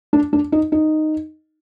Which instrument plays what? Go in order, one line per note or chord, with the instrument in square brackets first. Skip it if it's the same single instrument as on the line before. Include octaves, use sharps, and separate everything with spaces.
[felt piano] D4
D4
D#4
D#4